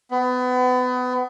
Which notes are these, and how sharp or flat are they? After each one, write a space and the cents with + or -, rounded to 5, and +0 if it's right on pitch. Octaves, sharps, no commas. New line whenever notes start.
B3 +30